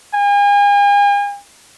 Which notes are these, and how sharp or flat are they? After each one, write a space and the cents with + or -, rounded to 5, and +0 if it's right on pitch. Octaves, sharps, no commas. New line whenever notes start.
G#5 -40